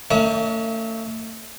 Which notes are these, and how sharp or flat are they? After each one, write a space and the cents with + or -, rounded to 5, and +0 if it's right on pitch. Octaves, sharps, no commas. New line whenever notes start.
A3 +40 C#4 +40 E5 -35